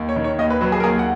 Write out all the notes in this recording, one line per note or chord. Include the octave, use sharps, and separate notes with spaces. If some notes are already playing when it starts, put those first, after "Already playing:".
Already playing: D#2
C#5
D#3
C#5
D#2 D#5
B4
F#3 B4
G#4
A#4
D#2 G#4
F#5